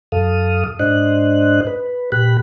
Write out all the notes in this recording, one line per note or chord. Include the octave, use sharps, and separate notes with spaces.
F#2 A4 F5 D#6
G#2 D4 C5 D#5 F#6
B4
A#2 G4 B5 F#6